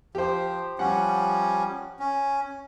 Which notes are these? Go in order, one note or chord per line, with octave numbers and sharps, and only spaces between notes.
F3 G4 C5
F3 G3 C#4 F#5
C#4